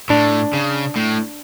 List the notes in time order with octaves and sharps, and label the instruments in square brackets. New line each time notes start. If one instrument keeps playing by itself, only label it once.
[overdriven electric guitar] A2 [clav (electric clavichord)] D4
[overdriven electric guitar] C#3
A2